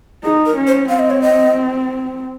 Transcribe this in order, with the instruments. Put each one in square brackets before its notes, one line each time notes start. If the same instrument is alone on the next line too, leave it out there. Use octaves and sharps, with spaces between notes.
[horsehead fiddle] D#4 [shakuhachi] G#4
[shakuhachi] A#4
[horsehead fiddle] C#4
[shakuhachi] C5
[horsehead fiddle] C4 [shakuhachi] F5
[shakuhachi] D#5
C#5
D#5